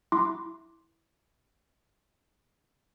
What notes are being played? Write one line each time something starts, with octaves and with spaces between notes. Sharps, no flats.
E4 C6 D6